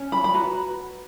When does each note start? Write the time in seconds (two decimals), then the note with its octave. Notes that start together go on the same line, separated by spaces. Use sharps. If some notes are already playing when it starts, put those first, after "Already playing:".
Already playing: C#4
0.12 B5
0.24 B5
0.34 F#4 B4 A#5